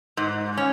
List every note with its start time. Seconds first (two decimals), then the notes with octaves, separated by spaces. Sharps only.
0.17 G#2
0.57 C#4